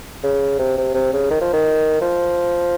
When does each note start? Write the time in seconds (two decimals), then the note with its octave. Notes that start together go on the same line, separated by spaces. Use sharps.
0.23 C#3
0.59 C3
0.77 C3
0.94 C3
1.13 C#3
1.30 D#3
1.41 F3
1.53 D#3
2.01 F3